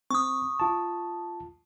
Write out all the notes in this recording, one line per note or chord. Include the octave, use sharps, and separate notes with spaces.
C4 C#6 D#6
F4 A5